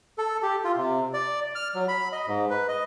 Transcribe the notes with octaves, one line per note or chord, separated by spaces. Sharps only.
A4
G4
F4
C3
D5
F6
F#3
B5
D#5
G#2
B4
D#5